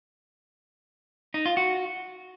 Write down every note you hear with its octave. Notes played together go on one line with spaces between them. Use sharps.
D#4
F4
F#4